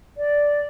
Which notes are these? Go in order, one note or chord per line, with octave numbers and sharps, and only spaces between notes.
D5